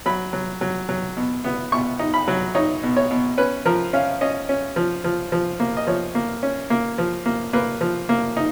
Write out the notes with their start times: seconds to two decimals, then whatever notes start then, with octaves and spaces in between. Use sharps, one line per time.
0.06 F#3 B5
0.33 F#3
0.61 F#3
0.89 F#3
1.17 B2
1.44 B3
1.72 B2 C#6
1.99 D#4
2.14 B5
2.28 F#3
2.55 D#4 C#5
2.83 B2
2.97 C#5
3.11 B2
3.38 C#4 B4
3.66 F3 A#4
3.93 C#4 F5
4.21 C#4 D#5
4.49 C#4
4.76 F3
5.04 F3
5.32 F3
5.60 A#3
5.77 D#5
5.87 F3 C#5
6.15 A#3
6.43 C#4
6.70 A#3
6.98 F3
7.26 A#3
7.53 A#3 B4
7.81 F3
8.09 A#3
8.37 D#4